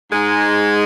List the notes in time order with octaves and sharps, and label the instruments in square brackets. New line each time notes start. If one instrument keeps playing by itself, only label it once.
[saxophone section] G#2 G#3